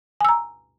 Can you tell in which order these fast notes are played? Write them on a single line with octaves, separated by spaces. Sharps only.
G#5 E6 A#5